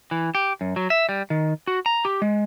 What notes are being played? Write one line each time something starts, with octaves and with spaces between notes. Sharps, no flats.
E3
G4
F#2
F#3
E5
G3
D#3
F#4
A#5
G4
G#3